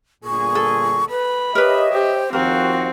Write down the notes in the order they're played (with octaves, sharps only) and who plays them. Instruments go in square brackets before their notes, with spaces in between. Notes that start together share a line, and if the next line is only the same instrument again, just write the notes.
[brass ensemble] G1 A#2 G#4 [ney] C#6
[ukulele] A4
[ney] B4 [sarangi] B5
[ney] G4 [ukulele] A#4 B4 [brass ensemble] C#5 D#5 E5
[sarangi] G4 [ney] C5
[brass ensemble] D#2 F3 F#4 [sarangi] C4 [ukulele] A#4 [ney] F5